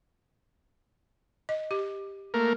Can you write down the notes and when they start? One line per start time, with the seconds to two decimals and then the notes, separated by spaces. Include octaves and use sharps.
1.49 D#5
1.71 G4
2.34 A3 A#3 A#4